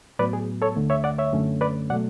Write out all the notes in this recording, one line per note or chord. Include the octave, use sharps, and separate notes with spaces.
A2 F#3 B3 B4 D5
G#4
A4 C#5
D2 D3 A3
C#5 E5
D5 F#5
C#5 E5
F#2 D3 A3 C#4
B4 D5
B2 F#3 A3 D5 F#5